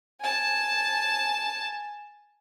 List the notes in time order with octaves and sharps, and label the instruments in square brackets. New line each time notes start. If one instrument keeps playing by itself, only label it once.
[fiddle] G#5 A5